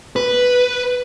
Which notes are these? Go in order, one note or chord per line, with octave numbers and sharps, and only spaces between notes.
B4